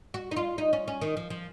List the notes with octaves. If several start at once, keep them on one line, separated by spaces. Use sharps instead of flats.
F#4
D#4
F4
D#4
C#4
C#4
D#3
F3
F3